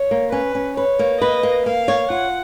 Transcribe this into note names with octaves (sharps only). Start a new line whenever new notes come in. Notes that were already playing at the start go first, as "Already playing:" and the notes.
Already playing: C#5
A#3
C#4 B4
C#4
B4 C#5
A#3
B4 D#5
A#3
A#3 F5
C#5
F4 F#5